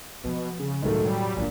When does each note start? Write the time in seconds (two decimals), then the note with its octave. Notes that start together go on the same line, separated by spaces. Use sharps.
0.24 B2 F3
0.59 C#3
0.82 E1 C#2 A2 D#3 F#3 A3
1.04 F#3 G3
1.37 E1 A#2 D4